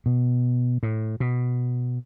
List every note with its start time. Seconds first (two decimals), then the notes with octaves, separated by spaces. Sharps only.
0.06 B2
0.83 A2
1.20 B2